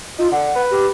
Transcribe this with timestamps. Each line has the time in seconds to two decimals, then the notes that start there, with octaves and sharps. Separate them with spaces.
0.19 D#4 F4
0.32 D3 F#5
0.56 B4
0.71 G4